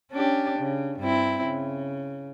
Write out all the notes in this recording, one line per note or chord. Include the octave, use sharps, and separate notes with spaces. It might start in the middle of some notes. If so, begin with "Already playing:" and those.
C#4 D4 G4
C#3
G2 C4 E4
C#3